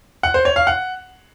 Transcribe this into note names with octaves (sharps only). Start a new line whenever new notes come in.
F#5
C5
C#5
F5
F#5